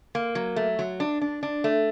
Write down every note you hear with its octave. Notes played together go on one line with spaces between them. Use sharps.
A#3
F#3
A3
F#3
D4
D4
D4
A3